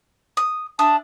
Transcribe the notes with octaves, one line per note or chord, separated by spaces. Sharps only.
D#6
D4 E5 A5 D#6